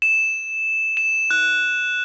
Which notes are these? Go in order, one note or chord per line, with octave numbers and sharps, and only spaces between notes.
E7
E7
F#6